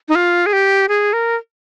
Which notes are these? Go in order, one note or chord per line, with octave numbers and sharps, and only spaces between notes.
D#4
F4
G#4
G4
G#4
A#4